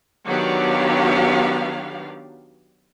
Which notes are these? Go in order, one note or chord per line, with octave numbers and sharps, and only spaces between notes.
D#3 F#3 B3 D4 G4 F5